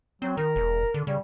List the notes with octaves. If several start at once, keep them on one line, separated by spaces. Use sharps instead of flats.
F#3 C4
D#3 A#4
E1
D3
C#3 G3